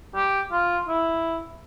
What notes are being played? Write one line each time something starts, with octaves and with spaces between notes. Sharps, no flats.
G4
F4
E4